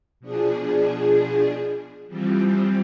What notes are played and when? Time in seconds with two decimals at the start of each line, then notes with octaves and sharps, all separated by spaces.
0.20 B2 F3 D4 G#4
2.08 E3 F3 G3 C4